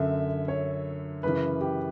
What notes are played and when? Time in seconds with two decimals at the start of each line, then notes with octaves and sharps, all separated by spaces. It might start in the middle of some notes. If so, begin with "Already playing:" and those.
Already playing: F#2 D3 E5
0.48 C#5
1.23 F#2 C#3 E3 B4
1.61 G4